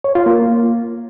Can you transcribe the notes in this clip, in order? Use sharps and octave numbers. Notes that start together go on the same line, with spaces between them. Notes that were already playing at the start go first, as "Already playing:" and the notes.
C#5
F4
A#3